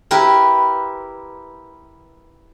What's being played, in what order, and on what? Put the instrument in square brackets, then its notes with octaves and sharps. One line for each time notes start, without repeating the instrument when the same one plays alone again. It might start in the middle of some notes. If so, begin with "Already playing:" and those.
[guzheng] E4 G4 A#4 B4